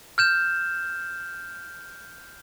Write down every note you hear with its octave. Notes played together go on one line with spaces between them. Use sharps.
F6 G6 E7